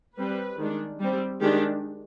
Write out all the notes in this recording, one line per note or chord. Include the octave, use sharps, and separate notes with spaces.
G3 C4 B4
D#3 G#3 D4
G3 C4
D#3 G#3 D4 G4